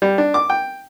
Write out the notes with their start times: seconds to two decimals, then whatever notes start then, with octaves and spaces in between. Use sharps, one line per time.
0.02 G3
0.18 D4
0.34 D6
0.50 G5